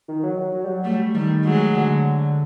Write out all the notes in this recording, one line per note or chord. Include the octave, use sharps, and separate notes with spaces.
D#3
F#3
F#3
F#3
G3
F#3
G3 A3
D#3 G3 A3
F#3 G#3
D3